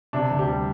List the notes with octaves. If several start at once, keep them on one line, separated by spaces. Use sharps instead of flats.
C3 D4
D2
G4
G3